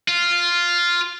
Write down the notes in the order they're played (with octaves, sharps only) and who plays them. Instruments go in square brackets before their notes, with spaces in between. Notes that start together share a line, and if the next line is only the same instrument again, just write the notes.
[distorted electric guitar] F4